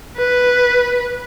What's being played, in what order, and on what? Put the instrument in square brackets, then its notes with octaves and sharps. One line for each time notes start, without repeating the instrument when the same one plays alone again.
[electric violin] B4